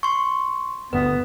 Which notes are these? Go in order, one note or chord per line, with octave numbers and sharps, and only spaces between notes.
C6 C#6
G1 D2 B3 B4